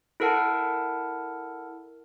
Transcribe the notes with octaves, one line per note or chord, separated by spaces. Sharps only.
E4 A4 A#4 F#5 A5